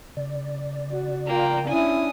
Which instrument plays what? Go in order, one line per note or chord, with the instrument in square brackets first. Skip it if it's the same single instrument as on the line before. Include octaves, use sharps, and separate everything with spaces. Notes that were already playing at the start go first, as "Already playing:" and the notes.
[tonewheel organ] C#3 D5
[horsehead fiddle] F#4
[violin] A#3 [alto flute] F4 [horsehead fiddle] G5 A#5
[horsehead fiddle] C#4 D4 [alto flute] E4 [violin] G#5 D#6